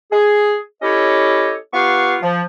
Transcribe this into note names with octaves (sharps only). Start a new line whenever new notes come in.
G#4
C#4 E4 G4 A4 C#5 D#5
B3 F4 G4 B4 F5 C#6
F3